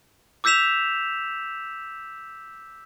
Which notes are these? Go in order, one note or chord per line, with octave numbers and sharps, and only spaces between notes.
D6 E6 G6 B6 E7 F7